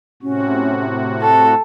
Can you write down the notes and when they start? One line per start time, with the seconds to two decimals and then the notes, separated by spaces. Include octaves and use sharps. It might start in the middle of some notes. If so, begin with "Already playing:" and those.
0.23 A2 C3 C#4 F#4
1.21 A4 A5